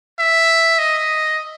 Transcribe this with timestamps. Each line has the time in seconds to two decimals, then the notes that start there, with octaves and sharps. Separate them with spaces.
0.19 E5
0.79 D#5